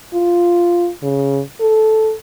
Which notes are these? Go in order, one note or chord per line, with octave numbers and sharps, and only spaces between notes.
F4
C#3
A4